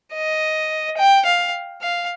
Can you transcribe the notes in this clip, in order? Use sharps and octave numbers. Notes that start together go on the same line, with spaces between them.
D#5
G5
F5
F5